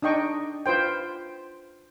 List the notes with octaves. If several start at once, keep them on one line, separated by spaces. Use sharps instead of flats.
D4 D#4 D#5 G5 C#6
F4 B4 C5 G5